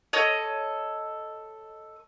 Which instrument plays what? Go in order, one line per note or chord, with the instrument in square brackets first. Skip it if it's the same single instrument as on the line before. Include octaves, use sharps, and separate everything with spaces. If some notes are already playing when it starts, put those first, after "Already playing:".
[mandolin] A4 C#5 D#5